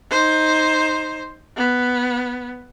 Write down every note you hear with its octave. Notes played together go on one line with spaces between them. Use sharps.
D#4 C5
B3